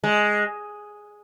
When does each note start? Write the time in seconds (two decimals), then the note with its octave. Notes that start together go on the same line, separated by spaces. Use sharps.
0.04 G#3